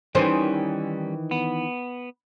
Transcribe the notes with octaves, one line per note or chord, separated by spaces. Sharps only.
D#3 E3 G3 C#4 C5
B3